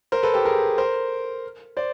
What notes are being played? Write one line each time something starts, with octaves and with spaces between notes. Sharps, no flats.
A#4 C5
A4 B4
G4 A4
G#4 A#4
A#4 C5
C5 D5